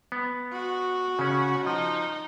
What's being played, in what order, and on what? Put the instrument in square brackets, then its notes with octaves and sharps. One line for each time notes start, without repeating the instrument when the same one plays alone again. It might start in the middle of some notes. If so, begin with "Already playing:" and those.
[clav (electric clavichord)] B3
[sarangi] F#4
[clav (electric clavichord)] C#3 C#4
[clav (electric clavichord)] F3 [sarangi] D#4